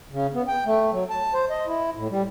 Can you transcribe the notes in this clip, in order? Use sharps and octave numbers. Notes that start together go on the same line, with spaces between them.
C#3
B3
G5
A3
F#3
A5
C5
D#5
E4
A2
G3